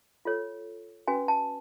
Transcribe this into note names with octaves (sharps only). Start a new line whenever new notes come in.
F4 A4 C#5
C#4 F#4 B4 G#5
A5